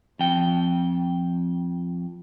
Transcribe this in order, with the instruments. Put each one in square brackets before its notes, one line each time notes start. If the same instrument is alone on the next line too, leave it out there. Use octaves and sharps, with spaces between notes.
[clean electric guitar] F2 G5